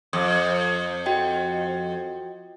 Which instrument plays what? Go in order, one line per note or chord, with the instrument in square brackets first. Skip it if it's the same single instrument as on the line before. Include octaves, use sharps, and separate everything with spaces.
[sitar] F2 [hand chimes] D#6
[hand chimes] F#4 D#5 G5